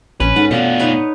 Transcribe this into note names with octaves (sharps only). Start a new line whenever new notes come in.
A#1 C#4 B4
G#2 A4 F#5
B2 A3 D4 F4 F#5
D#4 B4 C#5